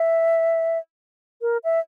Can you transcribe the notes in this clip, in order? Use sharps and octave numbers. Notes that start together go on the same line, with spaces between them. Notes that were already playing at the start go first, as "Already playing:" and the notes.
Already playing: E5
A#4
E5